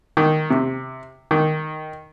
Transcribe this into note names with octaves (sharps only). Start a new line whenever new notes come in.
D#3
C3
D#3